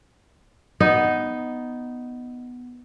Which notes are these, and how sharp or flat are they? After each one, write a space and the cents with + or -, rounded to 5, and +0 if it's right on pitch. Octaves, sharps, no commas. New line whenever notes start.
B3 +0 D#4 +0